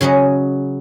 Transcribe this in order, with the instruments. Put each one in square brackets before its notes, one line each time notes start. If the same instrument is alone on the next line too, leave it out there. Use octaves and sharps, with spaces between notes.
[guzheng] C#3 F#3 C#4 D#5